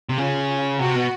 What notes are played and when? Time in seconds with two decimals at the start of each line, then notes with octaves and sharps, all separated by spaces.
0.09 C3
0.18 C#3 F4
0.79 C3 F#4
0.95 B2